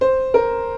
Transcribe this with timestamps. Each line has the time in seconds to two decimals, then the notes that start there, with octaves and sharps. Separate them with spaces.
0.01 C5
0.34 A#4